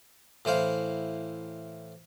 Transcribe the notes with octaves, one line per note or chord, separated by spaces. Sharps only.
A2 E3 C5 F5